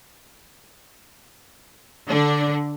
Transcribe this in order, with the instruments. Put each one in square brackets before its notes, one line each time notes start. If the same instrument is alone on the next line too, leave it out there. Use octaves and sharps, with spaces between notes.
[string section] D3 D4